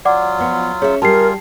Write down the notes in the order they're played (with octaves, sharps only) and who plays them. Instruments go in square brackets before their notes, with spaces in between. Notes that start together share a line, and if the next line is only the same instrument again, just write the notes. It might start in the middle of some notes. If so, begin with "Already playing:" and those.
[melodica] F#3 F4 [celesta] D5 F#5 D6
[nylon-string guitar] F3 B3
[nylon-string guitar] C#4 E5 [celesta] G#4 C#5
[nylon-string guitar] G3 G4 [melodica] F4 G#4 [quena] A#4 [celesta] A5 C7